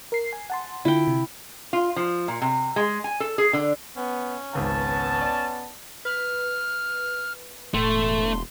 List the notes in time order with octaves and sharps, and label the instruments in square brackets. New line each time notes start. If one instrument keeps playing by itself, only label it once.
[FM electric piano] A#4 C7
G#5
F#5 A5 C6
[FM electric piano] D3 F4 [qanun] E4 G5
[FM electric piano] C3
[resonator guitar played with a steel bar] F4
F3
A#2
C3
G#3
G#5
A4
G#4
D3
[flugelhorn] B3 [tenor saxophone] C#4
[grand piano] G#1 C#2 F#5 [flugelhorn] B3 [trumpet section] A5
[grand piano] D5
[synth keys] B4 [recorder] F6
[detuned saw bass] E1 [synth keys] A2 A4 [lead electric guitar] A3 [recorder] C6